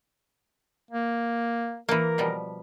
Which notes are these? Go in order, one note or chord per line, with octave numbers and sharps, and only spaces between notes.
A#3
E3 A#3 A#4
B2 F3 G3